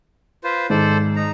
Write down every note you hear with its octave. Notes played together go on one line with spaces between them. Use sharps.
F4 B4 C5
G#2 D#3 A4 C5 D5
D#4 A#5